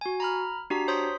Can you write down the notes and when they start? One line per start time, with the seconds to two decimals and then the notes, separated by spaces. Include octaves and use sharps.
0.01 F#4 G#5
0.20 A#5 B5 F6
0.70 D4 F#4 G4 A#5 B6
0.88 C5 C#5 C6 D#6 G6 B6